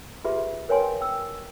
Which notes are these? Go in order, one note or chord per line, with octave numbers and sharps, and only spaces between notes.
F4 G4 G#4 B4 E5 C6
A#4 B4 C#5 G5 G#5 C6
G5 E6